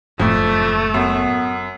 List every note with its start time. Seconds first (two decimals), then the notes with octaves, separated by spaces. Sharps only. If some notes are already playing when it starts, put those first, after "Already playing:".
0.20 F#1 F2 A2 A3
0.94 F#2 B3